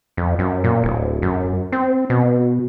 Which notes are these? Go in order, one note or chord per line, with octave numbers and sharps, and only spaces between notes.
F2
F#2
A#2
D1
F#2
C4
B2